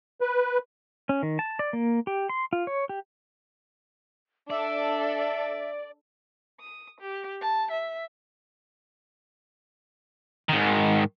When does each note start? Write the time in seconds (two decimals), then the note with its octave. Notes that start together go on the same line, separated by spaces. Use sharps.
0.21 B4
1.09 C#4
1.23 D#3
1.39 A5
1.59 D5
1.73 A#3
2.07 G4
2.29 C6
2.53 F4
2.67 C#5
2.89 G4
4.50 D4 A4 D5 E5
6.60 D#6
7.00 G4
7.41 A5
7.71 E5
10.49 G#2 D#3